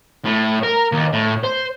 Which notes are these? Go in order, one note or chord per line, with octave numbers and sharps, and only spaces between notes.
A2
A#4
D#2
A2
C5